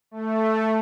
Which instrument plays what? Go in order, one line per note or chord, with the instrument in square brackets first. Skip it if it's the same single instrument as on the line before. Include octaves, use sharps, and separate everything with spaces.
[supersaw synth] A3